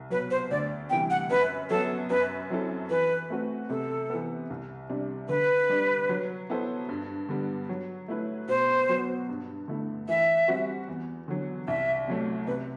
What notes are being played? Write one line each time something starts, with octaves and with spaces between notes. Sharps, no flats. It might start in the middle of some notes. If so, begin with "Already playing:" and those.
Already playing: C2
B2 F#3 B4
C5
D2 D5
C3 E3 G3 G5
F#5
F#2 B4
F#3 B3 A4
F#2 B4
F#3 C4 E4 A4
E3 B4
A3 C4 F#4 B4
C3 A4
E3 B3
C2
C3 G3 D4
D3 B4
G3 D4
F#3
B3 E4 A4 C5
G2
D3 G3 B3
F#3
A3 E4 B4
B2 C5
F#3 B3 F#4
G2
D3 A3 E4
E3 E5
G3 C4 F#4
E2
D3 F#3
C2 E5
C3 F#3 A3
C3 B4